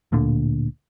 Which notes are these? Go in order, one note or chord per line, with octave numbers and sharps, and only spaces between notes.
D1 D2 A#2 D3